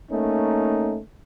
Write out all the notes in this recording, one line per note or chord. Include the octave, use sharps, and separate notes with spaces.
A3 A#3 C#4 D#4